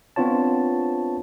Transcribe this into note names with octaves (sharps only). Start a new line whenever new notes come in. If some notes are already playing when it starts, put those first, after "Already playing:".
B3 C4 D4 F4 C#5 A5